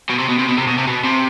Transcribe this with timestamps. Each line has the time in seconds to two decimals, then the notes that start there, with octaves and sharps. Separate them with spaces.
0.09 B2
0.18 C3
0.29 B2
0.38 C3
0.48 B2
0.58 C3
0.67 B2
0.78 C3
0.87 B2
1.04 C3